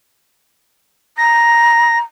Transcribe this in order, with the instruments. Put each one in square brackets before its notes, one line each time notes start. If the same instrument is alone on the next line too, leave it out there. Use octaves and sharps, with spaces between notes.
[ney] A#5 [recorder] A#6